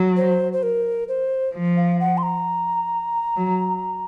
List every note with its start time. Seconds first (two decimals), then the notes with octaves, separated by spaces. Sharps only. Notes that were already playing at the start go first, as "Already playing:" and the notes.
Already playing: F#3
0.16 C5
0.53 C5
0.63 A#4
1.08 C5
1.54 F3
1.77 F5
2.00 F#5
2.18 C6
2.23 A#5
3.36 F#3